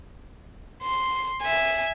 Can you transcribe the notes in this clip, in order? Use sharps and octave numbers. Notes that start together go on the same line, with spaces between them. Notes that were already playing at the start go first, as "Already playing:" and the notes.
C6
E5 G#5